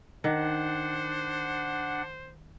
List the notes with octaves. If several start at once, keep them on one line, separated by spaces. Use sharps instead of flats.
D#3 D4 C5 F#5